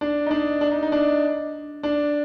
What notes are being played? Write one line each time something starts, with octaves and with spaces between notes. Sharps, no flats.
D4
D#4
D4
D4
D#4
D#4
D4
D4